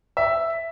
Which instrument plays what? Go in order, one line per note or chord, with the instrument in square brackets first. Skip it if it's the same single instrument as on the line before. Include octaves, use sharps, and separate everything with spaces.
[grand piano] E5